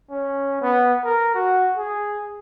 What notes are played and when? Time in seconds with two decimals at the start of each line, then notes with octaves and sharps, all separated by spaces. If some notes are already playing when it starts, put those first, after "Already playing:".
0.10 C#4
0.62 B3
1.05 A#4
1.34 F#4
1.77 G#4